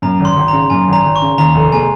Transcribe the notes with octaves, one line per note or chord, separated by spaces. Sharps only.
F#2 A#5
G#1
C6
G#1
C#3 A#5
F#2 G#5
G#1 A#5
G#1
C#6
C#3
D#2 A#5
F1
G#3 G#5